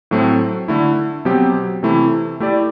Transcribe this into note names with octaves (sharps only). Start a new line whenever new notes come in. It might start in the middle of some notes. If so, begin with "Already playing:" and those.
A2 F#3 A3 C4
D3 A3 E4
B2 F#3 C4 G4
C3 E3 A3 E4
A3 E4 G4 D5